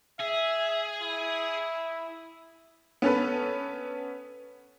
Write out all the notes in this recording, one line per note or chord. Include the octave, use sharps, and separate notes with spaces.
G#4 E5
E4
B3 C#4 A4 B4